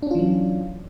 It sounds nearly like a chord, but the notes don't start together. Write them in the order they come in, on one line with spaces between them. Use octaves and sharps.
D4 C#4 F4 E3 F#3